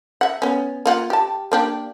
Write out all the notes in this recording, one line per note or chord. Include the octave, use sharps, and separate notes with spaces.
E5 F#5
B3 C#4
A#3 F4 F#5
G4 A5
A#3 D4 G4